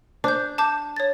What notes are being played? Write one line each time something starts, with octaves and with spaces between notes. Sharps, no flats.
D4 C5 G6
A5 D6 G6
C#5 A6